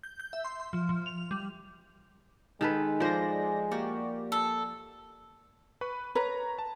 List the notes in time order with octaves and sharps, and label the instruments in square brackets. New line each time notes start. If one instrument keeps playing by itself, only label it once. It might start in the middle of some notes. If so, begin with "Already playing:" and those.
[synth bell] G6
G6
E5
C6
C6
F3
F3
F7
G3
[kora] D#3 A4 B4 [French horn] G#3
[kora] F3 C5 [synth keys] D5 A#6
[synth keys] A#3 G4 D5 [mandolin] F#4
[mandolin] A4
[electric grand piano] B4 B5 C#6
[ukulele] B4 [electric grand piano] C#5 A#5
[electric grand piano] A5